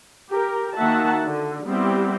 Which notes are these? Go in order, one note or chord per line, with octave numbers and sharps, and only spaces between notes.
G4 A#4
D#3 A#3 F#4 E5 F#5 A5
D3
G3 B3 C4 E4 G4